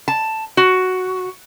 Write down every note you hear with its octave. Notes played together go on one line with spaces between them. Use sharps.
A5
F#4